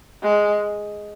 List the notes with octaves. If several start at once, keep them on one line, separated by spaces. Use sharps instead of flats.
G#3